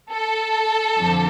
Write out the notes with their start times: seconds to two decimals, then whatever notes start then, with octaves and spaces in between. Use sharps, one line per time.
0.12 A4
0.98 F2 D3 F3